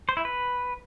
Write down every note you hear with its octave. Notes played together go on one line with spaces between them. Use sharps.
C5
E4
B4